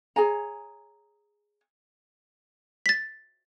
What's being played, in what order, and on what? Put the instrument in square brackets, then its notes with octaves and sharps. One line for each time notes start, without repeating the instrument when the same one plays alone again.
[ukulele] G#4 C#5 G#5 A#5
[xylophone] A6 B6